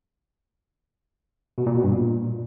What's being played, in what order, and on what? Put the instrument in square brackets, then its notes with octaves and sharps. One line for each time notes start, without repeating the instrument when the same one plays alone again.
[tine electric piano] B2
A#2
B2
G2
A#2